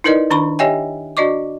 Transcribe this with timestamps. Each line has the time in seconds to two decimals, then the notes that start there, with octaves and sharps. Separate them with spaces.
0.04 D#4 E4 A#4 B4 D5 D#5
0.30 D#3 D4 A#5 B5 C#6
0.59 G4 C#5 D#5 E5 G5 G#5
1.17 D4 F#4 D5 D#5 C#6 D6